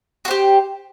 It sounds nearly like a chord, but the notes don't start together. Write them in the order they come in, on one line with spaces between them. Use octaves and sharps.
F#4 C5 G4